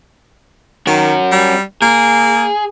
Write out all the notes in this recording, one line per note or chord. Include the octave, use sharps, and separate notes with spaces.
D#3 C#4 F#4
G3
A#3 G#4